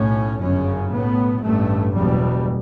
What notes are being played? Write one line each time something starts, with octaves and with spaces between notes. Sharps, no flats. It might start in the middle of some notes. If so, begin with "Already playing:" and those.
Already playing: B1 A2 C#4
G1 F#2 C#3 C#4
B1 A2 B3
A1 G2 A3
F#1 E2 B2 G3